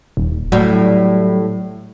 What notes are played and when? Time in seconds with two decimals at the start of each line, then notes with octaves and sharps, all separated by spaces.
0.17 D#1
0.52 A2 F#3 G3